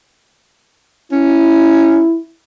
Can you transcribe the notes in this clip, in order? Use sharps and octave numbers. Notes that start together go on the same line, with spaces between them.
C#4 E4